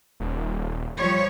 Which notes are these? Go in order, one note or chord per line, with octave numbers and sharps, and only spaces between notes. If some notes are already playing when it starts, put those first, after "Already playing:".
D#1
F3 G3 C#5